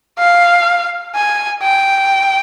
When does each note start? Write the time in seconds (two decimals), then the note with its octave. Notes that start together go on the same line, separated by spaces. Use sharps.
0.19 F5
1.15 G#5
1.63 G5